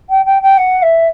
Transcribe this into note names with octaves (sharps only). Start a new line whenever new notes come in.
G5
G5
G5
F#5
E5